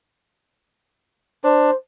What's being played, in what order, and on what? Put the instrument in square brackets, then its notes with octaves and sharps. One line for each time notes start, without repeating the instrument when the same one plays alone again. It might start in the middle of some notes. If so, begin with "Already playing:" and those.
[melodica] D4 [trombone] C5